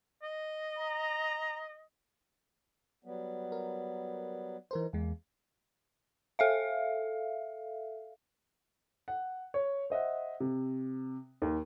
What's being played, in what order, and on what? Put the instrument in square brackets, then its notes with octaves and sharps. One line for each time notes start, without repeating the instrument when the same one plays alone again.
[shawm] D#5
[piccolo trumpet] A#5
[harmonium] F#3 G3 B3
[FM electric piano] A#4
[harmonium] D#3 [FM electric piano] E3 A#4 C5
[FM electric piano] E2 G#3 [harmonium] A#3
[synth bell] A4 E5 F5
[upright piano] F#5
C#5
C5 D#5 E5 F#5
C3
D#2